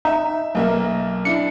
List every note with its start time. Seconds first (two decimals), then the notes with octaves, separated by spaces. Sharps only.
0.05 D#4 E5
0.55 B1 A#3 E5
1.25 D4 E4 C#7